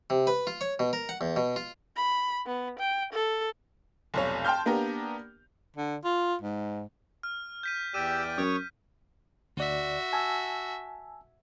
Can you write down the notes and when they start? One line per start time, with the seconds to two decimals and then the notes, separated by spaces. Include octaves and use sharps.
0.10 C3
0.27 B4
0.47 F4
0.61 C#5
0.79 B2
0.93 A#4
1.09 F#5
1.21 E2
1.36 B2
1.56 F4
1.96 B5
2.46 B3
2.79 G5
3.13 A4
4.14 F1 B1 C#5
4.45 G5 A5 C6 F6 G6
4.66 A#3 B3 D4 G4 A#4
5.77 D3
6.04 F4
6.41 G#2
7.23 F6
7.63 G6 B6 D#7
7.94 E2 G4 D5 G5 E6 D#7
8.38 F#2 C#5 C#6 D#6
9.57 D2 F#4 D5 E5
10.13 G#5 A5 E6